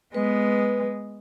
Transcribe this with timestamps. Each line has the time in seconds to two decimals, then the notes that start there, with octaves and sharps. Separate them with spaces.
0.14 G#3 B3 B4